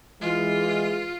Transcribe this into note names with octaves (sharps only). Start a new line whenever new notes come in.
E3 G#3 F4